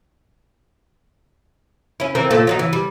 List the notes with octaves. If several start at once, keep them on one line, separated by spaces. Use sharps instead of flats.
C#4 E4
E3 C4 A#4
A#2 A3
F#3 G3 D#4
E3
G3